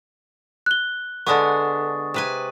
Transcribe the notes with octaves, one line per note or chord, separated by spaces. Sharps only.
F#6 G7
D3 G#3 B3 C#6 D#6 A6
C3 B4 G#5